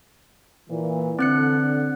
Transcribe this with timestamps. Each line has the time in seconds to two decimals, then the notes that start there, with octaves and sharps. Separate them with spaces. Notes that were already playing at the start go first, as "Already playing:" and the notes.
0.68 A#2 E3
1.19 D3 C4 F#6 C#7